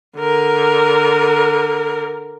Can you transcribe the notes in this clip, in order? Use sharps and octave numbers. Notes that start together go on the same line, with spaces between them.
D3 A#4